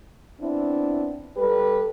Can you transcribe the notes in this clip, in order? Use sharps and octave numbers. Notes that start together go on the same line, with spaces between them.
B3 C4 D4 E4
G3 G4 A4 B4